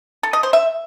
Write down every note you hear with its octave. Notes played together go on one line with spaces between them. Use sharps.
A4
D#5
C5
E5